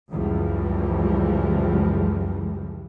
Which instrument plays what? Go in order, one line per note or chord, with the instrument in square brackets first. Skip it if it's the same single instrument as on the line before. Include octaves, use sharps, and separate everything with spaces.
[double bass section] C#2 F#2 E3 F3 G3